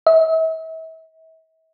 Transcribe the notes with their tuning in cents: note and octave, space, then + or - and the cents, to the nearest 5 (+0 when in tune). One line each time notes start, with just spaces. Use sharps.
E5 -40